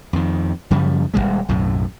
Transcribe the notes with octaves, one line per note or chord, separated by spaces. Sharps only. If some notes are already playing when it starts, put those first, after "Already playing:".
F2 D#3
F#2 C#3 F3 G3
D#1 F#2 G3 G#3
B1 F#2 A2